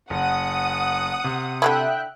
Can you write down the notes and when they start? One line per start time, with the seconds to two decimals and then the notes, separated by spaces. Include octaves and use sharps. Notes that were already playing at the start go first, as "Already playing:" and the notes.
0.10 F#1 F#5 D#6
1.24 C3
1.62 D3 E3 E4 E5 G5 F#6